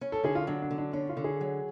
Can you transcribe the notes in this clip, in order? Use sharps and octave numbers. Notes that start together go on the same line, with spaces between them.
C#4
A4
D3 G#4
F4
F#3 D4
D4
D3
D4
C#4 D4
F4
D3
G#4
F#3